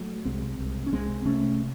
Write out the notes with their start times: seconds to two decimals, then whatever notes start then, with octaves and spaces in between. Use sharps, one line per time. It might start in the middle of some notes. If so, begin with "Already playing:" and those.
Already playing: F#3 A3
0.25 C2 G#3 C4
0.59 C2
0.87 C#4
0.93 C2 G#3 C4
1.26 C3 A3 C#4